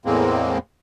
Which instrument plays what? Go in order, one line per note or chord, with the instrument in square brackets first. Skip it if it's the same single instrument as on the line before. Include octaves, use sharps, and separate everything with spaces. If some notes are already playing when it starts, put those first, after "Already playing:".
[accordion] E2 A2 G#3 A#3 C4